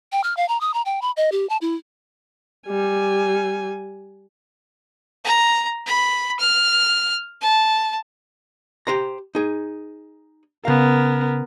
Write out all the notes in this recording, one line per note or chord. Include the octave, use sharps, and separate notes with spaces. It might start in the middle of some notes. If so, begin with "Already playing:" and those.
G5
F6
F5
A#5
D#6
A#5
G5
B5
D#5
G4
A5
E4
G3 G#5
A#5
B5
F6
A5
G4 C5 A#5
D#4 G#4
C#3 B3 A#4 F5